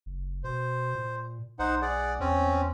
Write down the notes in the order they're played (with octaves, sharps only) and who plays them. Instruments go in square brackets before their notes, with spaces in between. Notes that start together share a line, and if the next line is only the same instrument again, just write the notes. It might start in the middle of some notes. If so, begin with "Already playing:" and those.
[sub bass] F#1
[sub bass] B2 [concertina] C5
[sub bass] A#2
[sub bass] B1 [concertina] D#4 C5 F#5
[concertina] G#4 D5 F#5
[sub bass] E2 [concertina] C4 C#4